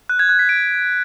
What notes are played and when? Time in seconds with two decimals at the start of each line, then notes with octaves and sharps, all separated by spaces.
0.09 F#6
0.19 G#6
0.29 F#6
0.39 B6
0.49 D7